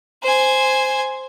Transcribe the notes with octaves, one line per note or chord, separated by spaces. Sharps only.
C5 G#5